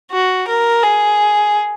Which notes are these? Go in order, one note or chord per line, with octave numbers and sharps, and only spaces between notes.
F#4
A#4
G#4